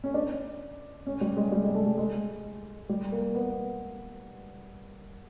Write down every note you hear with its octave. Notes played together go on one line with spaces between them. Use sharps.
C#4
D4
C#4
G3
G#3
G3
G#3
A3
G3
G#3
G3
A#3
B3